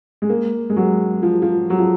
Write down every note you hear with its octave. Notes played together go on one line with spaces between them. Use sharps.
G#3
A#3
G#3
F#3
F3
F3
F#3
F3